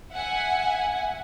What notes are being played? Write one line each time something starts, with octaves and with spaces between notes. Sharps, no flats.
E5 F#5 G#5